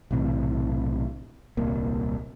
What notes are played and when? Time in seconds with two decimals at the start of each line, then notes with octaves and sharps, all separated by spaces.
0.11 B1 A2 C3 E3
1.57 D#1 C2 A#3